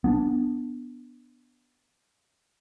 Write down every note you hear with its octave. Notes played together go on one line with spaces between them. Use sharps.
B3 C#4 D4